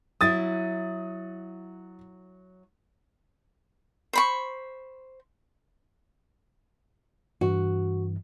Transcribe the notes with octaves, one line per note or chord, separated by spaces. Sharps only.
F#3 E4 D#6 A6
C5 B5 C#6
G2 E3 F#4